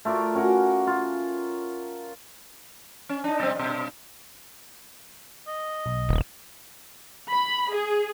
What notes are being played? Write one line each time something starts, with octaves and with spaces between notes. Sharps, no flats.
A3 F4 A#4 D5
C#4 F#4 A#4 F#5
F4
C#4
D4 D#4
B2 G3 C4
G2 B2
D#5
B1
D#1
B5
G#4